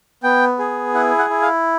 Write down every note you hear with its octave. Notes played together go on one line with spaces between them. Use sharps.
B3 G5
G#4
E4 F#5
F#5
E4
F5